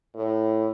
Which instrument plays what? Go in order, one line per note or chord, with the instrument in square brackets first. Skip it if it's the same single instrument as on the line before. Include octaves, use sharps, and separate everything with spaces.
[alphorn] A2